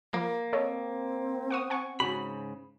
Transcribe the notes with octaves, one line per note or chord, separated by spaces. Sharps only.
F3 A#3 A#4
C4 A4 C#5 D#5
F#5 C#6 D#6
F#5 G#5 C#6
G#2 C#3 F#4 B5